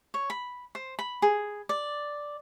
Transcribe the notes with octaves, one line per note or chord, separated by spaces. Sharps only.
C#5
B5
C5
B5
G#4
D5